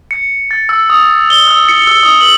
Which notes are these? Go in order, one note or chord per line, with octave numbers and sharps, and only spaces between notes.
C#7
A6
E6
D#6
G7
E6
C#7
E6
D#6
F#7